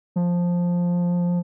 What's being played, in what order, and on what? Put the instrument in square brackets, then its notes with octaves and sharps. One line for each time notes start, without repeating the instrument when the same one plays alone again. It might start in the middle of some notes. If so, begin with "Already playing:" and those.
[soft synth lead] F3